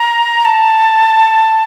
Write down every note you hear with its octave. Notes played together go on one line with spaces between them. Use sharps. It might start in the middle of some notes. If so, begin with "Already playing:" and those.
Already playing: A#5
A5